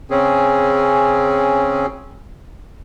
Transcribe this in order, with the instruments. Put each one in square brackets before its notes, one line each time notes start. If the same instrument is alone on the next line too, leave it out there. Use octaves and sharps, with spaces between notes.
[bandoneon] C#3 C4 C#4 G#4